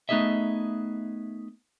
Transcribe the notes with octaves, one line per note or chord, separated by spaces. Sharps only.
A3 B3 D#4 G#4 D#5 E5